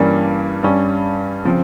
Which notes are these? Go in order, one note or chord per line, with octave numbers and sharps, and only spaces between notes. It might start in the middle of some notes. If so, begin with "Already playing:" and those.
Already playing: G2 E3 G3 A#3 C#4
G2 G3 C#4
C#3 F3 C4